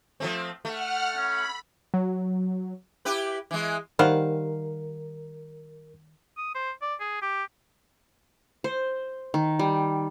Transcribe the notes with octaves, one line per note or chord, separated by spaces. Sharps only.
F3 A3 C4
A3 F#5 F6
C#4 B5
F#3
E4 G4 B4
E3 G#3
D#3 G3 A#4 C5 F5 F#5
D#6
C5
D5
G#4
G4
C5
D#3
G3